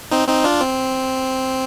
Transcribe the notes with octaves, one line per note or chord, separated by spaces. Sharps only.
C4 D#4
C4 D#4
D4 F4
C4